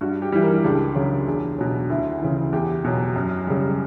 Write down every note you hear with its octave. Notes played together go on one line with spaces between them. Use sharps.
G2 F#4
G4
E3 G3
A#4
C#2 D4
C#3 F#3
E2 D4
B2 F#3
D2 E4
C#3 E3
E2 G4
B2 F#3
F#2
C#3 G3